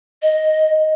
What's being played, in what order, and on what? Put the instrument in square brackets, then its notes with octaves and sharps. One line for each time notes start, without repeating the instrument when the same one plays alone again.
[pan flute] D#5